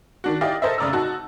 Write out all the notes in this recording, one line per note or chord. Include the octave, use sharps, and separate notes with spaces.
D#3 D4 F#4
E4 G4 D5 D#5 F5
A4 A#4 C5 D#5 E5
F1 C#3 D5 A#5 E6
D#4 F#4 A5